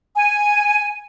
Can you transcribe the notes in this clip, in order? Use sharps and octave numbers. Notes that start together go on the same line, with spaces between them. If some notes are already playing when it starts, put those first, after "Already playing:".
G#5